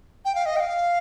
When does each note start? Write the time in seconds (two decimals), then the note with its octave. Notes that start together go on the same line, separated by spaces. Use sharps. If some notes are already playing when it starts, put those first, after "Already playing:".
0.25 G5
0.35 F5
0.46 D#5
0.56 G5
0.60 F5